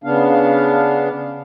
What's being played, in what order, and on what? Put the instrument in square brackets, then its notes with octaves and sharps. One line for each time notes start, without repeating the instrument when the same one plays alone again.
[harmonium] C#3 B3 D4 F5